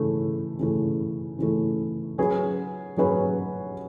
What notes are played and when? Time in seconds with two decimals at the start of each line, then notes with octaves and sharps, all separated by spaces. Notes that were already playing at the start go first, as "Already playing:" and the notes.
Already playing: C#3 E3 A3
0.59 C#3 E3 A3
1.39 C#3 E3 A3
2.18 F#3 C#4 G#4 B4
2.97 F#3 C#4 G#4 B4